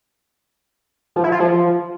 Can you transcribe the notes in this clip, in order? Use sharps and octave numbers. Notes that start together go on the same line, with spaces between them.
F3
E4
F4
F3